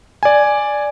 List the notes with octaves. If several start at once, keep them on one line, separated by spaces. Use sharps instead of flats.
D5 G#5